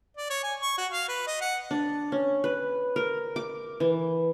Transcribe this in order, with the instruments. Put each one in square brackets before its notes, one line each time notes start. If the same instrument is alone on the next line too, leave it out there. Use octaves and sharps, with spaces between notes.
[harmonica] D5
C#5
G#5
C#6
F#4
F5
B4
D#5
F#5
[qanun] D4
C#4
B4
A#4
D6
E3